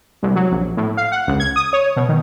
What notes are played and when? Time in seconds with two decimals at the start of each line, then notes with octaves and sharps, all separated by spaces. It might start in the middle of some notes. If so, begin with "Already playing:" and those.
0.23 C2
0.36 F#3
0.52 A#1
0.77 A2
0.97 F5
1.12 F#5
1.28 C#2
1.40 G#6
1.56 D#6
1.73 C#5
1.96 B2
2.09 D#3